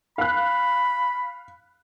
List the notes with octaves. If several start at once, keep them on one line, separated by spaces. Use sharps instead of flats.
F5 B5 F#6